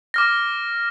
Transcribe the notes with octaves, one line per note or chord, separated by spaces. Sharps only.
D6 F6 A#6